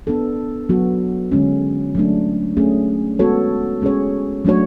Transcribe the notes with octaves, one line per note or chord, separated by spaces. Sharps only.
B3 D4 A4
F#3 B3 F#4
D3 G#3 C#4
F#3 A3 D4
A3 C#4 G#4
G#3 B3 F#4 A4 C#5
G#3 C#4 G#4 C#5
F#3 A3 D4 F#4 C#5